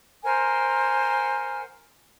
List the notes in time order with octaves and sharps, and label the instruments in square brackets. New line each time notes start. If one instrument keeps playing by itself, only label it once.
[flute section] A#4 C5 F#5 G#5